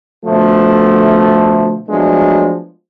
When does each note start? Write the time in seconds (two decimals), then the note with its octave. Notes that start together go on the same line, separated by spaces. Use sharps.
0.25 B2 D3 F3 A3
1.88 F3 F#3 G#3 A3 B3 D4